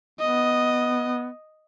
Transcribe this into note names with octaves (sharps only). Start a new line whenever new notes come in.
B3 D#5